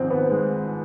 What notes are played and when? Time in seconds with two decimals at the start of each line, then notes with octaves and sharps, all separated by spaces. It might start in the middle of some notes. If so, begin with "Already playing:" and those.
Already playing: G#1 G#2 F3 C4
0.10 B3
0.30 G#3